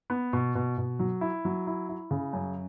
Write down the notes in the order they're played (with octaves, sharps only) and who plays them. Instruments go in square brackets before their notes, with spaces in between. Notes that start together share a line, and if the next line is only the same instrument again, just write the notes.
[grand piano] B3
B2
B2
B2
F#3
E4
F#3
E4
E4
C#3
F#2